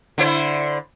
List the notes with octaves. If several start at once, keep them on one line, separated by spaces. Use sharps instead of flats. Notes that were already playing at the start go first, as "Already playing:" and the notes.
D3 E4 C5